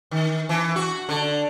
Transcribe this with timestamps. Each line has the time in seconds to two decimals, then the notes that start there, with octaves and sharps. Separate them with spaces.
0.11 D#3
0.49 E3
0.76 F#4
1.09 D3